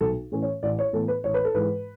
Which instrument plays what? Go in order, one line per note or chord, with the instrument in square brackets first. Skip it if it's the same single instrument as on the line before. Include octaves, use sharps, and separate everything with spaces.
[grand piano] B1 A4
A2 E3 A3 C#4
C#5
A1 D5
C#5
A2 E3 B3 A4
B4
A1 C#5
B4
A4
G#2 E3 G#3 B4